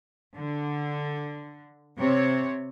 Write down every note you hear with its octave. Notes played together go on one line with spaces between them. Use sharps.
D3
C3 C4 C#5